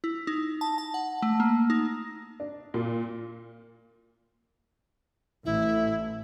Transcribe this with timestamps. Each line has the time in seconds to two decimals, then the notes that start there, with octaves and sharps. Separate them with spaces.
0.04 E4
0.27 D#4
0.61 A5
0.78 A5
0.94 F#5
1.22 A3
1.40 A#3
1.70 D#4
2.40 D4
2.74 A#2
5.45 A1 E4